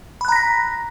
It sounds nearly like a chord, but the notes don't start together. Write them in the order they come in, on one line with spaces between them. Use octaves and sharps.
B5 F#6 A#5 A#6 B6